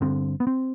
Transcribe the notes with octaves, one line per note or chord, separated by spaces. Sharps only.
G1 G2 D3 C4
B3
C4